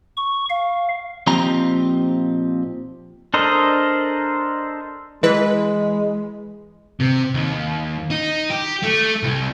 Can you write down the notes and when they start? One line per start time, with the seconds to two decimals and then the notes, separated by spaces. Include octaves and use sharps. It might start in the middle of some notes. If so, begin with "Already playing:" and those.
0.17 C#6
0.50 F5
1.27 A#2 F3 C4 D#4 G4 A#5
3.34 D4 A4 A#4 C5 D#5
5.23 E3 G#3 B4
7.00 C3
7.34 D#2
8.10 D#4
8.50 G4
8.83 A3
9.23 C2